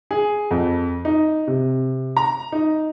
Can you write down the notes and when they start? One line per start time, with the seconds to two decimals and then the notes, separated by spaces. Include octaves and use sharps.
0.11 G#4
0.51 F2
1.05 D#4
1.47 C3
2.17 A#5
2.52 D#4